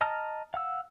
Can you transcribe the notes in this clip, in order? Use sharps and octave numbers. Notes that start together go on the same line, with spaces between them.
D#5 A5 A#5 F6
F5 F#5 E6